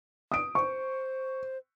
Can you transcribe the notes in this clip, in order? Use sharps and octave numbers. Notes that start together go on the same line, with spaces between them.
D#6 D7
C5 C#6